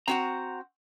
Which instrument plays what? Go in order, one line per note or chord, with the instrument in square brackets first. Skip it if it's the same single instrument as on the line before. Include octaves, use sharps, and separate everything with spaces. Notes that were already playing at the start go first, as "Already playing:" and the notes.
[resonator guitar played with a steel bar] C4 F#4 F#5 [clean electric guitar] A#5